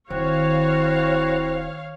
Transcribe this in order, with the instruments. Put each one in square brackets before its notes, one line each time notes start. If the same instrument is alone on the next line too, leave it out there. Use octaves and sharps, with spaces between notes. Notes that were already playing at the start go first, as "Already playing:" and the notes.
[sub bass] D1 [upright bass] D#3 [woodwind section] C4 E4 F#4 [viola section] C#5 F5